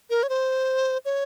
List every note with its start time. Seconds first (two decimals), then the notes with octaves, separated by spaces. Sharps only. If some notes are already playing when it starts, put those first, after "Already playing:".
0.10 A#4
0.23 C#5
0.29 C5
1.05 C#5